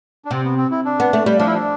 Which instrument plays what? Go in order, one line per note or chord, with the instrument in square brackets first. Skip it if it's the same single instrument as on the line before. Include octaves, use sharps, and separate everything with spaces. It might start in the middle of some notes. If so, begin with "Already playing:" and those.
[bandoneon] D4
[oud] C3 [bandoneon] C4
[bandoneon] B3
C4
E4
D4
[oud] B3
A3
G3
[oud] F3 [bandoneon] D4
[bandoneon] E4
D4